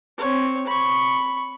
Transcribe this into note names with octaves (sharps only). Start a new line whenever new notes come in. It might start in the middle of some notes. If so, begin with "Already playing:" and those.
C4 C#5
B5 C#6